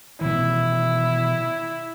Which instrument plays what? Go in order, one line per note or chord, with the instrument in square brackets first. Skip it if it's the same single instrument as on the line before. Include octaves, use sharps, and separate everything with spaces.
[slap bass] B2 D#3 E3 [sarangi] E4